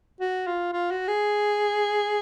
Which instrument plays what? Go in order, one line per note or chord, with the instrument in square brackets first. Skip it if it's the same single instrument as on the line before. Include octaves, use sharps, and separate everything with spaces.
[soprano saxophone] F#4
F4
F4
F#4
G#4